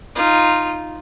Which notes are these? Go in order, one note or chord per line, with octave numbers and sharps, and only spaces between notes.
D#4 F4